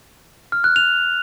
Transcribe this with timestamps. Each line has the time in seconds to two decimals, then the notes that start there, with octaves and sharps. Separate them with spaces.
0.52 F6
0.64 F#6
0.76 F7